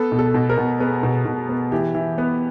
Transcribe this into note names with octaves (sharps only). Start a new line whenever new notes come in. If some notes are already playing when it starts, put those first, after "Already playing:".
Already playing: B3 A4
B2
A4
B2
A#4
B2
B3 G#4
B2
B2
B3
E3 G4
E3
B3